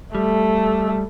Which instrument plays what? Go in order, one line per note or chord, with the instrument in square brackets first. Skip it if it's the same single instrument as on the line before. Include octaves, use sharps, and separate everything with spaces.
[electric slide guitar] G3 [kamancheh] A3